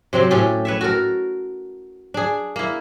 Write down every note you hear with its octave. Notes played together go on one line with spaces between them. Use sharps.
C3 F#3 C4 G4
A2 C#4 G4 A4
B4 C#5 E5
F#4 A4 A#4
D4 G#4
A#3 E4